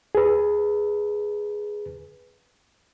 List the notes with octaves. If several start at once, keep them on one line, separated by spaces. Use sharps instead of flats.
G#4 B4